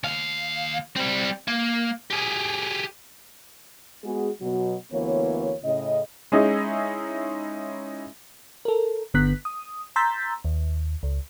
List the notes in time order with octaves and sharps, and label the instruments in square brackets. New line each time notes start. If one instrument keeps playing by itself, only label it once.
[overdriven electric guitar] D#2 F5
G3 C4
A#3
G4 G#4
[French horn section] G#3 B3 F#4 G#4
B2 F#3 F#4
D2 E3 A#3 B3 C#5
A2 C#3 D#5
[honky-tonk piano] G#3 C#4 D#4 E4 G#4
[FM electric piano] A4 A#4
G1 D3 B3 F#6 B6
D#6
A#5 C6 E6 G6 A6 B6
D#2
C#2